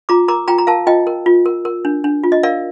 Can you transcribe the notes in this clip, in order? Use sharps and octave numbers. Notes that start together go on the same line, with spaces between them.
F4 A#5 D6
A#4 A#5 D6
F4 G5 A#5
A#5
A#4 F5 A5
F4 D#5 G5
A#4
F4
A#4
A#4
D4
D4
F4
D#5
A#4 D5 F5